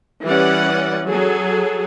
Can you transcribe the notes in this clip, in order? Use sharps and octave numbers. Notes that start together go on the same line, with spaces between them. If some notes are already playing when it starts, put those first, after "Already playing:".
E3 G3 C#4 B4 D5 F#5
F#3 G#4 A4